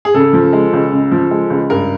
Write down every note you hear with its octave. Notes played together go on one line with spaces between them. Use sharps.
G#4
C#3 A4
F3
G#3
C#2
C#3
F3
G#3
C#2
G2 A#4